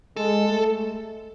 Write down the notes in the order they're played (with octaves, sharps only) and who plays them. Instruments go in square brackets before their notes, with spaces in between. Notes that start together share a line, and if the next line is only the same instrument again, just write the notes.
[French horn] G#3 [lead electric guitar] A4
[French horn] A3